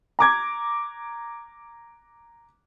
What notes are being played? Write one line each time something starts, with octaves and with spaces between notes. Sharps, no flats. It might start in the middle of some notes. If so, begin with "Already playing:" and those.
A#5 D6 G#6